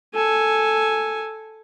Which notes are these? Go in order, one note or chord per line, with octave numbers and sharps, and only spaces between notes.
A4 G#5